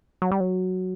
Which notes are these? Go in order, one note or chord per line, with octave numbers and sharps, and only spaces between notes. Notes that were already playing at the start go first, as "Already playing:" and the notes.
F#3
G3
F#3